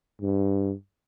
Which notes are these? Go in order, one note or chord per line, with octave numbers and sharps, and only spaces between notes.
G2